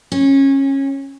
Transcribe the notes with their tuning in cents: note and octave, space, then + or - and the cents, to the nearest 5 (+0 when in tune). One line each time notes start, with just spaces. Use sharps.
C#4 -20